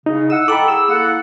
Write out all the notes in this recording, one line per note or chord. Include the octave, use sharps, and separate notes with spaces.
C#3 D#4
E4 D#5 F#5 E6
A4 F#5 G5 A#5 B5 D6
E4 G#4 E6
A#3 A4 F#5